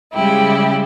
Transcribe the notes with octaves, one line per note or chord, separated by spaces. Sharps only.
C#3 G3 G#3 E4 G4